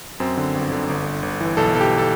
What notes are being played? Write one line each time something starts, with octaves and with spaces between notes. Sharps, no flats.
F#2 C4
D3
G1
D3
G1
G1
G1
E3
B1 A4
B1 A4
G4
A4